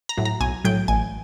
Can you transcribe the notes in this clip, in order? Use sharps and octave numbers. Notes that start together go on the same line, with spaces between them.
A#5
A2 F#3
A#5
B1 G#5
A2 F#3 G5
A1 G#5